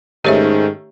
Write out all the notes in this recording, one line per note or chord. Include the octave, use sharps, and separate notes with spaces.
G#2 D#3 A3 C#4 G4 C#5 E5